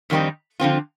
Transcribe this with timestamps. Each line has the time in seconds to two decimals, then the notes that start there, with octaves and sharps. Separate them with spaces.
0.10 F2 D#3 G3 C4 D#4
0.60 D3 F3 C4 F4